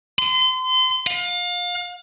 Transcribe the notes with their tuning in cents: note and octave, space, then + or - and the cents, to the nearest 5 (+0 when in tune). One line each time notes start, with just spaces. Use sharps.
C6 -35
F5 +30